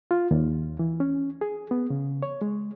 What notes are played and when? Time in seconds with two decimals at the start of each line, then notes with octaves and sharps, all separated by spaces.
0.11 F4
0.31 D#2
0.79 E3
1.00 C#4
1.41 G#4
1.71 B3
1.90 C#3
2.23 C#5
2.41 G#3